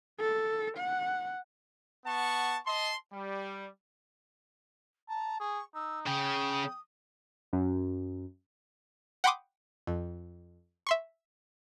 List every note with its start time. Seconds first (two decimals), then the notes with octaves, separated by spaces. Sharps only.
0.20 A4
0.77 F#5
2.06 B3 F#5 A5 C#6
2.66 D#5 A5 C6
3.12 G3
5.09 A5 A#5
5.40 G#4 C#6
5.75 D#4 E6
6.07 C#3 G5 D#6
7.53 F#2
9.24 F#5 G5 B5 C6 D6 D#6
9.87 F2
10.87 E5 C6 C#6